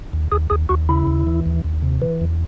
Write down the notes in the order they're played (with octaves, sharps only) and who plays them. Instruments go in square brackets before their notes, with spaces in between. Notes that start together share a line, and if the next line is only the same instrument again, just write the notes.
[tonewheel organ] D#2
D#2 G#4
D#2 G#4
D#2 F#4
C#3 E4
D#2
E3
D#2
D#2
C3
E3
E2